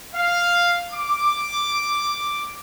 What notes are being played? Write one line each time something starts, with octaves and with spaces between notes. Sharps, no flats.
F5
D6